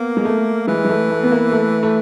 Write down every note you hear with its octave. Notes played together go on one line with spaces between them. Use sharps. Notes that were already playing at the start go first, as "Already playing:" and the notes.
Already playing: A#3 B3
G#3
A3
E3 G#3
G#3
A3
A3
B3
A#3
A3
A3